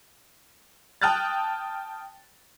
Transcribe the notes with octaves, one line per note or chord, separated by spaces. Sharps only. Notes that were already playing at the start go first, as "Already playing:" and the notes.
G5 A5 D#6 F6 F#6 A6